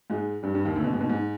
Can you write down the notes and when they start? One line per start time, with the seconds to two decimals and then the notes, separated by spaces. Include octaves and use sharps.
0.10 G#2 G#3
0.43 G2 G3
0.54 G2 G3
0.65 D#2 D#3
0.76 D2 D3
0.84 B2
0.93 G#2
1.01 B2
1.09 G#2